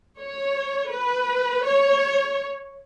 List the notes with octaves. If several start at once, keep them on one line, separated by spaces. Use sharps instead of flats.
C#5
B4
C#5